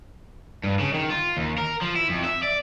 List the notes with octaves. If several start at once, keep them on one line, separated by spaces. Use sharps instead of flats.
G2
C#3
D#3
F4
D#2
A#4
F3
E4
F2
E5
D5